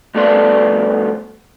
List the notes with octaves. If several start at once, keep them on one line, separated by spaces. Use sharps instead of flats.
G2 A3 B3 D5 C6